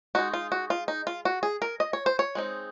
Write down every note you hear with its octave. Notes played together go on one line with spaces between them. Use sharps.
G#3 D#4 F#4
F4
F#4
F4
D#4
F4
F#4
G#4
A#4
D#5
C#5
C5
C#5
G#3 C4 D#4